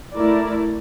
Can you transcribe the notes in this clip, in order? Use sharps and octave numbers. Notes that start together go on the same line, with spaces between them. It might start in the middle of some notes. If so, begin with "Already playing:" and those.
A3 E4 A#4 D5